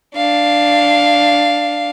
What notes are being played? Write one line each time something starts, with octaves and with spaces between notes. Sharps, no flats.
D4 F5